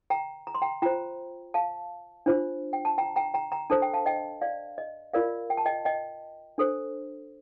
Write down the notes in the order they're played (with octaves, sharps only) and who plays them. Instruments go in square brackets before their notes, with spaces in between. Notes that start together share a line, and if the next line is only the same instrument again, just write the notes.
[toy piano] G5 A#5
A#5
C6
G5 A#5
F4 C5 G5 A#5
F5 A5
D4 F4 C5
G5
A5
G5 A#5
G5 A#5
G5 A#5
G5 A#5
D4 A4 C5 A5
G5
F5 A5
D#5 G5
D5 F5
D#5
F4 A#4 D5 F5
G5
A5
D#5 G5
D#5 G5
D4 A4 C5